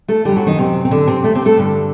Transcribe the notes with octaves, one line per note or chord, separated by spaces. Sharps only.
A3 A4
F#2 D3 G3 G4
F#3 F#4
D#3 D#4
C3 C4
C4
D3 D4
C3 C4
A3
C3 C4
A3 A4
G2 D3